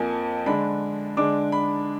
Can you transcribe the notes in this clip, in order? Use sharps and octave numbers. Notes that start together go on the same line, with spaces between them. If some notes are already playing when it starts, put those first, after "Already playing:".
Already playing: F2 F3 A#3 G#5
D3 G#3 D4 B5
D3 G#3 D4 D6
B5